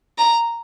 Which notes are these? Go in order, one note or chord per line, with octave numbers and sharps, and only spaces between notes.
A#5